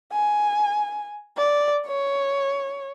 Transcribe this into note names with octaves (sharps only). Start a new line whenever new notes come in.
G#5
D5
C#5